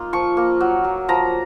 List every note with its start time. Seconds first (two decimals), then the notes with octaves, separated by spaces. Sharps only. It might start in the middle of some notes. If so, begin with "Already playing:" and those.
Already playing: A#3 D#4 F4
0.13 F3 C#6
0.37 A#3
0.60 F#3
0.84 F#3
1.08 F3 A#5